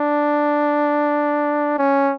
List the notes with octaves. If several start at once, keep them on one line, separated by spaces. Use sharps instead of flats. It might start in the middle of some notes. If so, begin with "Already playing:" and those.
Already playing: D4
C#4